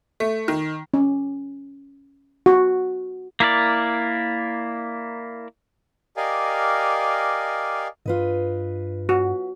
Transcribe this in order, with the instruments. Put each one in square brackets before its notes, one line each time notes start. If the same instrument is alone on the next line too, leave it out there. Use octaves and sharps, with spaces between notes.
[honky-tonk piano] A3
D#3
[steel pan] C#4
F#4
[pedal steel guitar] A#3 E4 A#4 D5
[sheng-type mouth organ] G4 A#4 D5 D#5 F5 G#5
[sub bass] G2 [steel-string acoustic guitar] F4 B4 D#5
[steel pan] F#4